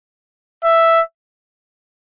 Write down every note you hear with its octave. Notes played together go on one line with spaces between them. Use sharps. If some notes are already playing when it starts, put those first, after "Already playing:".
E5